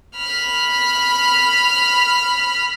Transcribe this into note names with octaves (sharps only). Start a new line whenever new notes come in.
B5 F6